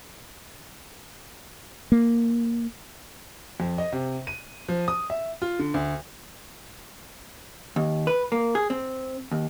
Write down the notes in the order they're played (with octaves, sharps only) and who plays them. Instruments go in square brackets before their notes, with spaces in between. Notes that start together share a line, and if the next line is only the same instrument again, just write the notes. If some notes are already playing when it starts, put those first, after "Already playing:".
[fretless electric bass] A#3
[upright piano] F2
D#5
C3
D#7
F3
D#6
E5
F4
D3
D2
[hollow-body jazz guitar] D#2
B4
A#3
G#4
C4
D#2